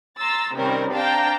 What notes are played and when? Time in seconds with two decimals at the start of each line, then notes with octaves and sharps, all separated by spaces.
0.18 A#5 C6 E6 A6
0.54 C3 D#3 G3 C4 C#4 A#4
0.94 C4 D4 F5 G5 A5 A#5